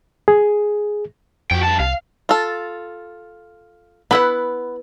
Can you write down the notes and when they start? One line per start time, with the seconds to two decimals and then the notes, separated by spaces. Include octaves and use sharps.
0.28 G#4
1.51 F2 F#4 G5
1.63 G2 A5
1.80 C2 F5
2.29 F4 A4
4.11 B3 E4 B4 F#5